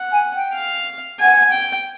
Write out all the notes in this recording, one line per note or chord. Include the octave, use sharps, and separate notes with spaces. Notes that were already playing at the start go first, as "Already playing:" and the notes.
Already playing: F#5
G#5
G5
F5
F#5 G#5
G5